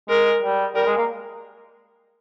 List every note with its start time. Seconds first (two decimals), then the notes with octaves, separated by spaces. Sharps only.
0.09 G#3 A#4
0.43 G3
0.75 G3 A#4
0.86 G#3
0.97 A#3